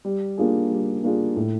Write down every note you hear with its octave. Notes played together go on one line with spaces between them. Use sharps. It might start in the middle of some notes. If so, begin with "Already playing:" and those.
G3
A#3 D4 F4 G#4
G3
A#3 D4 F4 G#4
A2